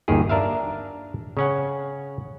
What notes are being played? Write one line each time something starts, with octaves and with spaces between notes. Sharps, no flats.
G1 D#2 D#3 G4 G#4
D4 A#4 E5 F5
C#3 C#4 F#5